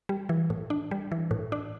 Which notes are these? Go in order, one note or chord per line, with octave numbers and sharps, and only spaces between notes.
G3
E3
A2
D4
G3
E3
A2
D4